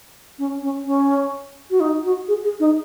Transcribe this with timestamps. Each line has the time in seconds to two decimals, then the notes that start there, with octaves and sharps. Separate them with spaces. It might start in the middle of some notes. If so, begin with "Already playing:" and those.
0.39 C#4
0.62 C#4
0.86 C#4
1.70 F#4
1.80 D#4
2.04 F#4
2.28 G#4
2.44 G#4
2.60 D#4